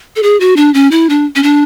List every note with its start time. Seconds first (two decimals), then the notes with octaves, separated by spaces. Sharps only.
0.16 A4
0.23 G#4
0.40 F#4
0.56 D4
0.74 C#4
0.91 E4
1.10 D4
1.36 C#4
1.43 D4